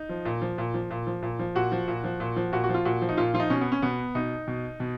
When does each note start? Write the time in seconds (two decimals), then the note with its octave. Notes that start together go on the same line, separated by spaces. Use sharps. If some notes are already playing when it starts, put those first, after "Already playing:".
Already playing: D#4
0.09 F3
0.25 A#2
0.42 F3
0.58 A#2
0.74 F3
0.90 A#2
1.07 F3
1.22 A#2
1.39 F3
1.55 A#2 F#4
1.72 F3
1.88 A#2
2.04 F3
2.20 A#2
2.36 F3
2.52 A#2 F#4
2.64 F#4
2.69 F3
2.74 F4
2.85 A#2 F#4
3.02 F3
3.09 D#4
3.17 A#2 F4
3.34 F3 F4
3.40 D#4
3.50 B2 C#4
3.61 B3
3.72 C#4
3.82 B2 B3
4.15 B2 D#4
4.47 B2
4.80 B2